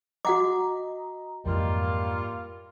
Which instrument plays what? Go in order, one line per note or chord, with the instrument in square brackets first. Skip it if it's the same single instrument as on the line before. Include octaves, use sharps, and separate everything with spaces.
[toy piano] F#4 F#5 D6 [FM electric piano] D#5 A#5
[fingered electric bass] F2 G#2 E3 [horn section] G3 A#3 F4